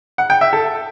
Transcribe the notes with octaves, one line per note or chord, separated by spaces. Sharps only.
F#5
G5
E5
A4